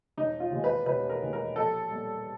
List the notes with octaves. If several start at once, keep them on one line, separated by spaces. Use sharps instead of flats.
E1 D#4
F4
D#2 D#3 G#3
B4
E1 B4
A#4
D#2 D#3 G#3
A#4
A#1 A4
A#2 G3